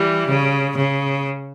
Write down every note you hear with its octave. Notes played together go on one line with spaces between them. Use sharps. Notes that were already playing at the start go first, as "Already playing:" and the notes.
Already playing: E3 G3
C#3
C#3